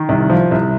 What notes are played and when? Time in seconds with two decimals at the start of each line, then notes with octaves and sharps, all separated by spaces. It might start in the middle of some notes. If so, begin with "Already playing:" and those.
Already playing: D#3
0.09 C2
0.30 F3
0.51 C2